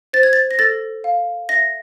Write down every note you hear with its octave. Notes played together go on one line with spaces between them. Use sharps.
C5 A6
G#6
A6
A#6
A4 A6
F5
E5 A#6